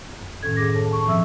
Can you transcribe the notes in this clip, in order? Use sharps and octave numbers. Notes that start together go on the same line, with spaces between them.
F#2
A2 D#3 C#4 A4 G#6
D2 G#4 D6 A#6
A4 C#5 A5
F#2 A5 C#6
G2 B2 F3 C4 E5 E6